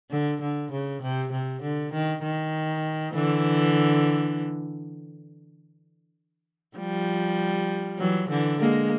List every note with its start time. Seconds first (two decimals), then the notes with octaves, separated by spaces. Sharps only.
0.11 D3
0.41 D3
0.72 C#3
1.02 C3
1.32 C3
1.62 D3
1.93 D#3
2.23 D#3
3.14 D3 E3
6.77 F3 G3
7.99 E3 F#3
8.29 D3 E3
8.59 G#3 A#3